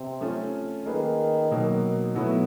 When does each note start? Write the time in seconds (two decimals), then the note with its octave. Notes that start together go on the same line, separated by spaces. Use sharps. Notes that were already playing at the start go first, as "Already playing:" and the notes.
Already playing: C3
0.21 A3 C#4 F4
0.85 D#3 A#3 D#4 G#4 B4
1.51 B2 F#3 A#3 D#4
2.15 B2 F#3 A3 B3 E4